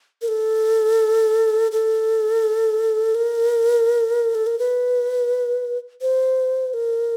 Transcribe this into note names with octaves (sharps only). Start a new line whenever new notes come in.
A#4
A4
A4
A#4
A4
A#4
B4
C5
A#4